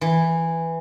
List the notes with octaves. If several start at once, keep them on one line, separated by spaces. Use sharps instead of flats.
E3